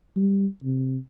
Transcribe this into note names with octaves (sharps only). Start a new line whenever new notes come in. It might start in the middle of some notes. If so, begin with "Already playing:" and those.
G3
C3